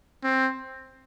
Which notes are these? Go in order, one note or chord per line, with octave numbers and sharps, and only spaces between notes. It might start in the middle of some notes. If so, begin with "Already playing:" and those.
C4